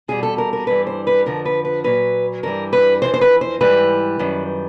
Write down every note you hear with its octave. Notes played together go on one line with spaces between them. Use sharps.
E2 B2 G3 G#4
A4
A#4
A#4
G2 E3 G3 B4
C5
B4
F2 D3 F3 A#4
B4
B4
A#2 F#3 B4
G2 E3 G3 A#4
B4
F2 C3 E3 C5
C5
B4
C5
G#2 E3 G3 B4
F#2 D#3 G3